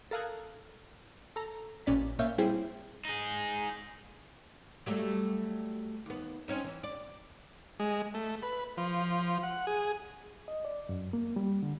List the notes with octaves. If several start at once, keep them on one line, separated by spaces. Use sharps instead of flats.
A4 A#4 F5 D#6 F#6 G#6
A4 A#5
A1 A#2 C#4 D5 B6
A#2 A#3 C#5 E5 F5 G6
G3 C4 E4 G#4 C5 G5
D#4 G#4
F#3 G3 A3
D#2 B3
C4 C#4 D#4
E3
D5
G#3
A3
B4
F3
F#5
G#4
D#5
D5
F#2
A#3
G3
D3